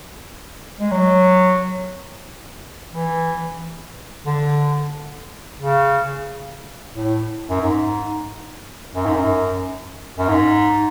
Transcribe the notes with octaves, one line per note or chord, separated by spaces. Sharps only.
G#3
F#3
E3
D3
C#3
A2
F#2
G#2
F#2
G#2
F#2
F#2
G#2